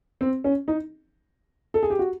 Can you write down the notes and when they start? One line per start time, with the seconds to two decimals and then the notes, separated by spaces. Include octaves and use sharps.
0.21 C4
0.44 C#4
0.68 D#4
1.74 A4
1.83 G#4
1.90 G4
1.99 F#4